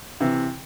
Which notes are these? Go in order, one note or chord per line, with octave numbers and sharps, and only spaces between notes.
C3 E3